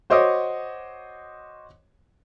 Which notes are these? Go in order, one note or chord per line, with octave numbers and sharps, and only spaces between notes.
F#4 C5 C#5 D#5 D6 D#6